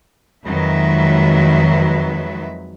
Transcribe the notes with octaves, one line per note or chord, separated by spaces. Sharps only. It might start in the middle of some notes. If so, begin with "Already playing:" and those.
F2 D#3 F#3 G#3 B4 E5